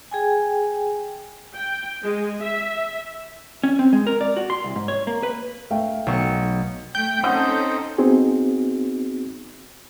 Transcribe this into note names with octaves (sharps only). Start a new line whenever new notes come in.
G#4 G5 G#5
G5
G#3
E5
C#4
C4
G#3
A#4
D5
F#4
C6
C2
G#2
C#5
A#3
B4
A3 F5 G5
B1 C#6
A3 G5 G6
C4 C#4 D#4 A4 F#5 D#6
B3 C4 D#4 F#4 G#4